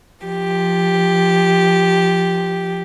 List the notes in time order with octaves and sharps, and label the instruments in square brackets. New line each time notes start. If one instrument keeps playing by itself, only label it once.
[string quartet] F3 G4